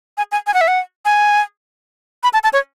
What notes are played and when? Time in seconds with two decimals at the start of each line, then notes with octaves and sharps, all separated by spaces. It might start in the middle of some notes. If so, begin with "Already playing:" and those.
0.18 G#5
0.32 G#5
0.47 G#5
0.54 F#5
0.61 E5
0.68 F#5
1.05 G#5
2.23 B5
2.33 A5
2.44 A5
2.53 C#5